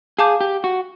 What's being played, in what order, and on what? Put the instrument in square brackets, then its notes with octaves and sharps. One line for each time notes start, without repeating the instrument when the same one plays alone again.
[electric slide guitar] G#4 [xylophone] F5 A5 D6 G6
[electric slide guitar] G4
F#4